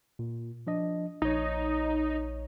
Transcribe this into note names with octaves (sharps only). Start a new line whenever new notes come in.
A#2
F3 D4 D#5
A#1 D#4 C#5